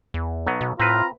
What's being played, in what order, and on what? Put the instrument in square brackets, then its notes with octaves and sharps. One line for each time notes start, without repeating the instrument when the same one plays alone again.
[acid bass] E2
[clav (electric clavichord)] B1 F#3 B3
[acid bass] B2
[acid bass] A2 [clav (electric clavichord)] C4 B4 [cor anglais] F4 [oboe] A#5